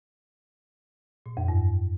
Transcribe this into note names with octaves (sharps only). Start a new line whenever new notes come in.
A#2
F2
G2